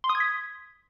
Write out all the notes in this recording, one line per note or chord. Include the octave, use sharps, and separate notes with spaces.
C6
D#6
G#6
B6